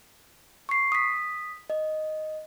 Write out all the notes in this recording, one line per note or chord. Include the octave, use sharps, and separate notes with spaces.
C#6 C7
D#6 B6
D#5